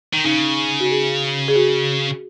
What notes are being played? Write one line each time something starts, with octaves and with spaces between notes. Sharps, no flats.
D#3
C#3 D#4
F#4
G#4
G#4
F#4